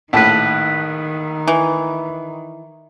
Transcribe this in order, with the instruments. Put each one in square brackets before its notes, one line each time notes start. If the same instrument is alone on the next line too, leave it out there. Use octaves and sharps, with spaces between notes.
[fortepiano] A#1 A2 A5 [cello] D#3 [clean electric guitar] E4 B4
[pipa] E3